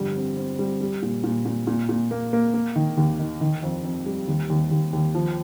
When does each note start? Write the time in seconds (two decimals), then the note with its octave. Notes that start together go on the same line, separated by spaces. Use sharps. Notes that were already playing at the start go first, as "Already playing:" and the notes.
Already playing: G1 F2 G3
0.16 C4
0.37 C4
0.59 G3
0.81 G3
1.02 A#2
1.24 A#2
1.45 A#2
1.67 A#2
1.89 A#2
2.11 A#3
2.33 A#3
2.54 A#3
2.76 D#3
2.97 D#2
3.19 D#3
3.41 D#3
3.63 F2
3.84 F2
4.06 G3
4.28 D#2
4.50 D#2
4.71 D#2
4.93 D#2
5.15 F3